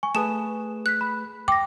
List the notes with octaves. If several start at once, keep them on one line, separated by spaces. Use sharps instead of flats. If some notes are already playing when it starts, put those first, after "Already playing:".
G#5 C#6
A3 G#4 B4 G#5 A5 D#6 E7
F#6 B6
B5
G5 D6 A#6